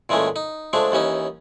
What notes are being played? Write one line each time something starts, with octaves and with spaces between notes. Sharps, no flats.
A#2 E3 G#3 A3 C#4
D#4
F3 G#3 A3 D4
D#2 E3 C#4 D#4